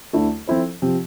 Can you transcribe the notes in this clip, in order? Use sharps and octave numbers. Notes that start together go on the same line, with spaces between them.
D2 D3 A3 E4
F3 C4 E4 A4 C5
C3 F3 C4